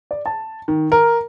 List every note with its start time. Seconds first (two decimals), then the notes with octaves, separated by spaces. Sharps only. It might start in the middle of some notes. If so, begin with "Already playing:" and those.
0.11 D5
0.26 A5
0.68 D#3
0.92 A#4